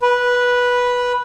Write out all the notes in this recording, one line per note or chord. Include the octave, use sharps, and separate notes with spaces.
B4